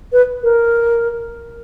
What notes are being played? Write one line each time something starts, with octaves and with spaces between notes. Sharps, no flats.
B4
A#4